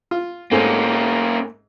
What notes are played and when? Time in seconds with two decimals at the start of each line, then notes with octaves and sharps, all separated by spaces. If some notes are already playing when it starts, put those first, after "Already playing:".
0.11 F4
0.51 G#2 A3 A#3 C4 C#4